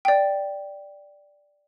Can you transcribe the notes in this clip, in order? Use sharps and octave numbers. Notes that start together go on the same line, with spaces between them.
D5 G5